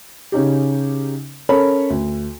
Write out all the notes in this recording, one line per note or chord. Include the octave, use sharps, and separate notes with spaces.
C#3 C#4 D#4 G4
C#4 A4 A#4 C#5 B5
D2